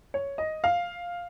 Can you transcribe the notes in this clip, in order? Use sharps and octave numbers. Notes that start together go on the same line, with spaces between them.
C#5
D#5
F5